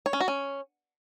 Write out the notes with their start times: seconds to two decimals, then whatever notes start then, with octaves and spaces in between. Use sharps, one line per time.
0.06 C#5
0.13 C#4
0.21 F#4
0.28 C#4